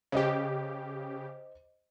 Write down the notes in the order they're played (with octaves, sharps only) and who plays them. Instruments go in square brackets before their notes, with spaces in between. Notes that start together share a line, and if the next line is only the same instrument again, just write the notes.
[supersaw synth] C#3 G4 [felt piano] C5 D#5